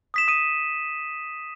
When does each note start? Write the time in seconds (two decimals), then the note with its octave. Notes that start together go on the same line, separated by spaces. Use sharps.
0.14 D#6 B6 E7
0.28 D#6 D#7